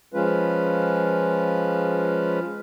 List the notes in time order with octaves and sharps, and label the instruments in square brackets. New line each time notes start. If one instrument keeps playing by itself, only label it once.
[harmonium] F3 G#3 C#4 F4 B4